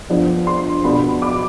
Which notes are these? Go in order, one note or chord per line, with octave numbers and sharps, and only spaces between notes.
G2 F3 B3 D4
C6
B2 B3 D4 B5
D6